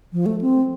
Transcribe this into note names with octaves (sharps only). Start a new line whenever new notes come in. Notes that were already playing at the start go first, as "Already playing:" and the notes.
F3
A3
C4